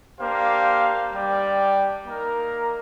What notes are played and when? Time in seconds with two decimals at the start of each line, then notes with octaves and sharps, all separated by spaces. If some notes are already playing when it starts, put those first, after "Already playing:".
0.19 A#3 D4 G4 C5 F5
1.13 G3 D4 G4 D5 G5
2.06 A#3 D#4 A#4